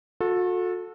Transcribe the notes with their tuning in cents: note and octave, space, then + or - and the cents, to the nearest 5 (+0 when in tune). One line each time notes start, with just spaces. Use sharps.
F#4 -40 A4 +0